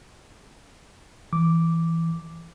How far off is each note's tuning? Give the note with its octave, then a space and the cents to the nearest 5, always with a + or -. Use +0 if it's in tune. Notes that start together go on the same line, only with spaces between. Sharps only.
E3 +0 D6 -5